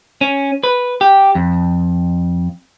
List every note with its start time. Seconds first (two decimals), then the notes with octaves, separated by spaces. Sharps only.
0.21 C#4
0.64 B4
1.01 G4
1.35 F2